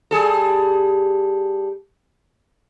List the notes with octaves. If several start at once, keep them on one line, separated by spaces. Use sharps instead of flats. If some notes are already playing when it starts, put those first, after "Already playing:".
G3 G#4 A4